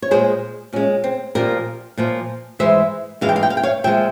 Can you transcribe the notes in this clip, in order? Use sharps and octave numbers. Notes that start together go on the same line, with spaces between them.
C#5
A#2 G#3 G#4 C5
A#2 G#3 C#4
C4
A#2 F3 A#3 G4 A#4
A#2 F3 A#3
G#2 E3 G#3 C5 E5
G#2 E3 G#3 F5
G5
F5
G5
F5
G5
C#5 F5
A#2 F3 G#3 E5 G5